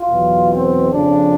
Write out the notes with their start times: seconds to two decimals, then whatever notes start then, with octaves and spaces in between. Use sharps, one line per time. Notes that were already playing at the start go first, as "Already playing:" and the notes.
Already playing: F4
0.10 E2 B2 F#3
0.50 C4
0.90 F2 C#3 F3 D4